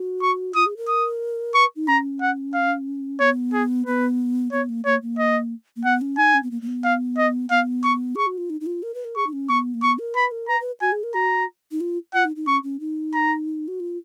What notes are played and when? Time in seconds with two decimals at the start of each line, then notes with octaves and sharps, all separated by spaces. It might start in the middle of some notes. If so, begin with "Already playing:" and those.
Already playing: F#4
0.22 C#6
0.55 F4 D#6
0.66 G#4
0.77 A#4
0.88 D#6
1.55 B4 C#6
1.76 D#4
1.88 C#4 A#5
2.21 F#5
2.54 F5
3.20 B3 C#5
3.53 G#4
3.86 B3 B4
4.52 B3 C#5
4.69 A#3
4.85 A#3 C#5
5.02 A#3
5.18 D#5
5.76 A#3
5.84 B3 F#5
6.01 C#4
6.18 D#4 G#5
6.34 C#4
6.43 B3
6.51 A#3
6.62 A#3
6.67 B3
6.84 F5
7.17 D#5
7.50 B3 F5
7.84 C#6
8.15 G#4 C#6
8.27 F#4
8.38 F4
8.50 D#4
8.61 D#4
8.66 F4
8.83 A#4
8.94 B4
9.05 A#4
9.16 G#4 C#6
9.27 D#4
9.33 C#4
9.49 B3 C#6
9.74 A#3
9.82 B3 C#6
9.99 A#4
10.15 B4 B5
10.31 A#4
10.48 B4 A#5
10.60 B4
10.81 F#4 G#5
10.92 G#4
11.03 A#4
11.14 F#4 A#5
11.71 D#4
11.81 F4
12.14 F4 F#5
12.25 D#4
12.36 D#4
12.47 C#4 C#6
12.63 C#4
12.80 D#4
13.14 A#5
13.68 F#4
13.80 F4